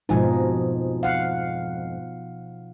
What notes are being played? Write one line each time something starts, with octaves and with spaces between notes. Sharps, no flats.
F2 G#2 B2 F3 D#4 G#5
F5 F#5